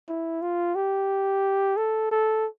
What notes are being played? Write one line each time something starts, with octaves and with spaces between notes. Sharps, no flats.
E4
F4
G4
A4
A4